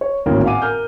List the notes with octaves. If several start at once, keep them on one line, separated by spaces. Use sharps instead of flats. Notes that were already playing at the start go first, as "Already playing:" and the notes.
C#5
G#1 D2 A2 A#3 C#4
F5 F#5 G#5 D6 D#7
A#4 F6 G6